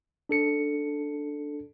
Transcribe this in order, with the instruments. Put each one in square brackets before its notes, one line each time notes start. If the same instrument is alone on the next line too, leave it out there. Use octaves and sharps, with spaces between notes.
[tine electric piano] D4 A4 C#7